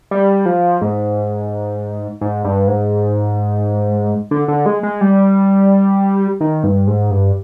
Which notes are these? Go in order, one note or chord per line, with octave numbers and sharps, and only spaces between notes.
G3
F3
G#2
G#2
G2
G#2
D3
D3
G#3
G#3
G3
D#3
G2
G#2
G2